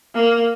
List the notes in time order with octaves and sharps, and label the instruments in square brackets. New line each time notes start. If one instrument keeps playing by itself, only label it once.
[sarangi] A#3